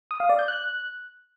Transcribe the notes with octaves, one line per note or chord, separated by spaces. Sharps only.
D#6
F5
D5
G6
F#6